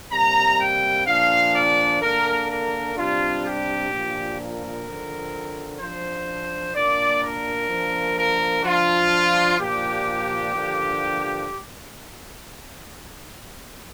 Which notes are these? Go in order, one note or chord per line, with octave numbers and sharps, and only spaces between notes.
C3 G3 A#3 A#5
G5
A#2 F3 D4 F5
D5
D3 A#3 D4 A#4
A#4
C3 G3 D4 F4
G4
A#2 F3 D4
A#4
D3 F3 C4
F3 D4 C5
A#2 A#3 D4 D5
A#4
F3 A#3 D4
A#4
F3 D4 F4
A#2 F3 A#3 D4 G4
D3 F3 A#3 D4